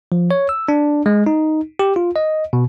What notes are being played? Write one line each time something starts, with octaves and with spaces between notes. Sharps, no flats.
F3
C#5
E6
D4
G#3
D#4
G4
F4
D#5
B2